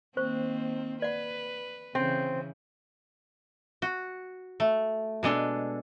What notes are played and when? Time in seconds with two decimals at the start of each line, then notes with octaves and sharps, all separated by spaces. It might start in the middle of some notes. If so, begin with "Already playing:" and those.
0.17 D#3 A#3 C4 C5 C#6
1.02 B4 D5 F#5
1.95 C#3 E3 C4
3.82 F#4
4.60 A3
5.23 B2 G#3 D4 A4